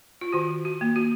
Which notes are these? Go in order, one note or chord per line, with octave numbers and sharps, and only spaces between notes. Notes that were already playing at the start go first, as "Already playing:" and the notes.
F4
D#3 F#4
F#4
A#3
F#4